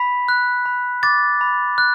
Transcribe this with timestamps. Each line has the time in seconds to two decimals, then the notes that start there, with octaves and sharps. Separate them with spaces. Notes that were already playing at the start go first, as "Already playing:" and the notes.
Already playing: B5 B6
0.29 F#6
0.66 B5
1.03 D6 A6
1.41 B5
1.78 F#6